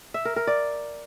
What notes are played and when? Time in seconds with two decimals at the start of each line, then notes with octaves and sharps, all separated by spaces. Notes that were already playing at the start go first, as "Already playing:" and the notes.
0.14 E5
0.25 A#4
0.36 A#4
0.47 D5